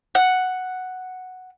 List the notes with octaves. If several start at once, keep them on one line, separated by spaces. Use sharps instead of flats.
F#5